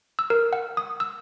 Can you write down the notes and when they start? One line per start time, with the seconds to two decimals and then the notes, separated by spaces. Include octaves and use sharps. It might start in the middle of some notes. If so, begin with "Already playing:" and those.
0.19 E6
0.30 A#4
0.53 F#5
0.77 D#6
1.00 E6